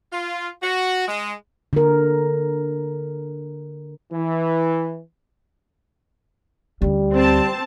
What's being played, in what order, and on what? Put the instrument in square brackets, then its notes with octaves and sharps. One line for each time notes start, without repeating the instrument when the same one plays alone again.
[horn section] F4
F#4
G#3
[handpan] D3 A#4
[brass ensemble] E3
[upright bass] D2 C#4 [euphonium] G3
[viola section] C4 A5